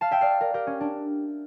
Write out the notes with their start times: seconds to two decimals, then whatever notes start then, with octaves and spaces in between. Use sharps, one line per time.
0.01 F5 A5
0.11 E5 G5
0.21 D5 F5
0.41 A#4 D5
0.54 G4 A#4
0.67 C#4
0.81 D4